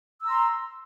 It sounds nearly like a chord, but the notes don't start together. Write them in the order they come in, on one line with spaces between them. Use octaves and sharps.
E6 A#5 C6